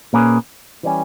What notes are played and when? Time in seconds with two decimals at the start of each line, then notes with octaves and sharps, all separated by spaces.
0.13 A#2 A#3 C#4 G#4 B4
0.83 E3 G3 C#4